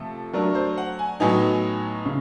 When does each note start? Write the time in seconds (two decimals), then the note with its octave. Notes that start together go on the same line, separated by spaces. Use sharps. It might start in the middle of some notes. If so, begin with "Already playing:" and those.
Already playing: C3 F3 A3 A4
0.33 F#3 A3 D4 A#4
0.55 C5
0.78 F#5
0.99 G#5
1.20 A2 F#3 B3 D#4 G#5
2.06 C#3